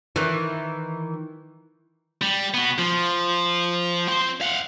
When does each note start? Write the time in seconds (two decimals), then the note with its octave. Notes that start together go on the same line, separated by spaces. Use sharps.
0.16 D#3 E3
2.22 G3
2.54 B3 F#4
2.78 F3
4.08 C4 C6
4.41 F5 F#5